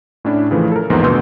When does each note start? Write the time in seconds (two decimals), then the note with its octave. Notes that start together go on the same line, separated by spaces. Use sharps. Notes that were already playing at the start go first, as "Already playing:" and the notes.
0.25 A2 C#4 D4 E4
0.51 C#3 E3 F3 A3
0.72 A4 A#4
0.90 E2 G#2 F3 A#3 B3
1.03 D2 B2 B3 C6 E6 G6